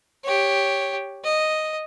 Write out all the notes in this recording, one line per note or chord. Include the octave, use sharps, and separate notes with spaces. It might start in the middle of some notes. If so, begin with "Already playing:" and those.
G4 C#5
D#5